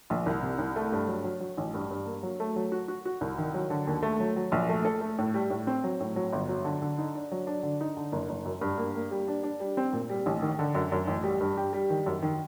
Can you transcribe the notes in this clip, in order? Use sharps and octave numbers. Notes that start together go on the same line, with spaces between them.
A#1
C2
C3
C2
A3
G2
F#3
F#3
F#3
A1
G2
G2
A#3
F#3
A3
F#3
F#4
F#4
F#4
C2
D#3
F#3
D3
D#2
A3
F#3
F#3
A#1
A3
A4
A3
A2
G3
A2
C4
F#3
A2
F#3
G1
F#3
D3
D3
D#4
D4
F#3
D4
D3
D#4
D3
F#1
F#1
F#2
G2
A#3
A#3
G3
D4
D4
G3
C4
A#2
G3
A1
D#3
D3
F#2
F#2
A1
G3
G2
G4
G3
D#3
F#2
D#3